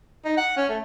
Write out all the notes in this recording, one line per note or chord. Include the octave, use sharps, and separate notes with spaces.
D#4
F#5
C#4
A3